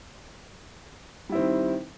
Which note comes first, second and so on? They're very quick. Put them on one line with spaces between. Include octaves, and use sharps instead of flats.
G3 E4 C4 D#3